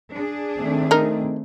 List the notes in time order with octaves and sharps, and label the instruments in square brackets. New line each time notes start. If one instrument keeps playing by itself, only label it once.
[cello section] D4 G#4
[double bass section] D#3 A3 C4
[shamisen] D#4 A#4